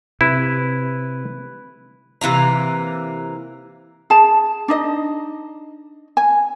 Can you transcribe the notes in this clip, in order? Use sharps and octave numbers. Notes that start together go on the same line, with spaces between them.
C3 E4 B4
C3 E3 A#3 A#5
G#4 A5
D4 D#4 D#5
G#5